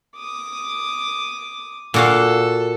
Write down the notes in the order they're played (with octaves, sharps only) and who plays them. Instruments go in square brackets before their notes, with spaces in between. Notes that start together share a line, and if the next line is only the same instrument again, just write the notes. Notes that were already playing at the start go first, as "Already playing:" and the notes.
[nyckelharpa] D6 D#6
[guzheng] A#2 F#4 F5 [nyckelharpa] A4